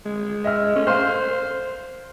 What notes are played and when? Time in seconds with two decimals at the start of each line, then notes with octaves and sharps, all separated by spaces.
0.05 G#3
0.44 D#5 E5 F6
0.76 A3 C#4
0.87 C5 F5 C6 F6